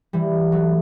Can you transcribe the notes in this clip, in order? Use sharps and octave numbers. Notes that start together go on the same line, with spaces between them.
E3 G3
F#3 A3